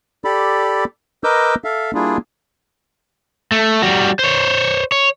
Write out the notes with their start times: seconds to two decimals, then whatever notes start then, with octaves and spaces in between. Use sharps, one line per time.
0.24 G4 A4 D5 B5
1.24 A#4 B4 D#5 D6 E6 G6
1.64 A4 E5 F5
1.94 G3 A#3 D4 E4 F4 G#4
3.52 A3
3.82 G3 F#4
4.19 C5 C#5
4.92 C#5